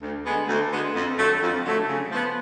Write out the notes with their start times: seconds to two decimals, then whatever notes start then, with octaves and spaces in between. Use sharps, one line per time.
0.01 D2
0.25 D3 G#3 B3
0.48 D2
0.71 D3 G#3 B3
0.94 F2
1.18 D3 F#3 A3
1.41 F2
1.64 D3 F#3 A3
1.88 C#3
2.11 F3 B3